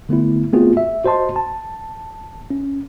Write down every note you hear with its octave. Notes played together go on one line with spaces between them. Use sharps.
D3 A3 B3 E4
A3 B3 C4 F4 F#4 G#4
E5
F#4 C5 D#5 A5 C6
A5
C#4